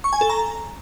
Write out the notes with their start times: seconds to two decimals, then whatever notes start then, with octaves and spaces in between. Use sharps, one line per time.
0.04 C#6
0.13 G#5
0.21 A4
0.30 A#5